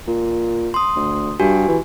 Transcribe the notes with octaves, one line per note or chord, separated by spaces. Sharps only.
A#2
C6 D#6
D2
G2 F#4 G4 G#5
E3